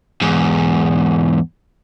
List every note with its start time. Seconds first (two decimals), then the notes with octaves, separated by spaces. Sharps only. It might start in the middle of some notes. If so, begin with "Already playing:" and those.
0.22 E2 G#2